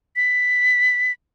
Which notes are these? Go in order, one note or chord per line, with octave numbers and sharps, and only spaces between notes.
B6